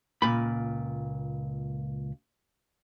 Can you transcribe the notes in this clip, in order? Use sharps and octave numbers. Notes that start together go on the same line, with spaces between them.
C#2 A#2 B5